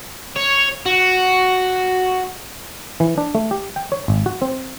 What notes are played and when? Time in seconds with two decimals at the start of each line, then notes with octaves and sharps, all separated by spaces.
0.36 C#5
0.86 F#4
3.00 E3
3.18 D4
3.35 A3
3.51 G4
3.76 G5
3.92 C#5
4.08 G#1
4.26 F#4
4.42 C4